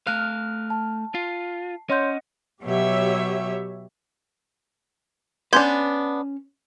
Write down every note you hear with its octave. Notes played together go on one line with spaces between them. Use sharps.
A3 F5 F6 F#6
A5
F4 C7
C#4 C#5 D#5 F#5 C6 G6
B2 F#3 G4 C#5 E5
B3 C#4 D4 B4 C6 G6 G#6